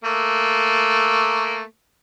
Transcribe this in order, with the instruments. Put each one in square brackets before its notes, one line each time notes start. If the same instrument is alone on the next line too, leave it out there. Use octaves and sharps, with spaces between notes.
[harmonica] A3 A#3